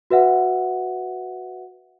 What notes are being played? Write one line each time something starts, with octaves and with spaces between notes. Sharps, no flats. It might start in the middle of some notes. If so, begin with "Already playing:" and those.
F#4 B4 E5 F#5